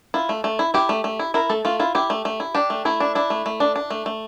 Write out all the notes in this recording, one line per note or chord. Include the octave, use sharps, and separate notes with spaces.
E4 F4
A3
A3
E4
E4 G4
A3
A3
E4
E4 A#4
A3 A4
A3 F4
E4 F4
E4 G4
A3
A3
E4
D4 G4
A3
A3 E4
D4
D4 E4
A3
A3
D4
D4
A3
A3